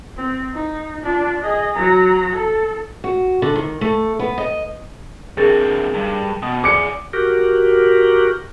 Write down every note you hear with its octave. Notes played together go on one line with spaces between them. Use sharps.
C4
D#4
D4 F4
G#4 D#5
F#3 A#5
A4
F#4
D3
D#3
A3
B3
D#5
D3 C4 G#4 A#4 A6
G2
B2 D#6
G#4 D5 D6 C#7
F#4 G4 A#4